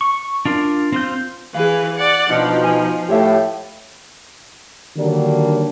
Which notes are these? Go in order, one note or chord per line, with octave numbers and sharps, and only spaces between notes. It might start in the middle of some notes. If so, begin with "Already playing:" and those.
C#6
D4 F4 A#4
C4 F4 G6
E3 G#4 B4 F5
D5 F#5
B2 F3 D4 D#4 D#5
G#5
A2 G4 C#5 E5 F5
D3 D#3 F#3 G3 A#3 D4